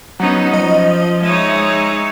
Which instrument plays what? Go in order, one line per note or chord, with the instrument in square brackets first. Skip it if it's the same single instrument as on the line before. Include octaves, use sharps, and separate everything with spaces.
[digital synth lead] F#3 [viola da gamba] B3 C#4 D#4
[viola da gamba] F3 [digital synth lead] D#5
[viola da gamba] G#3 D#4 C#5 [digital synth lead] E5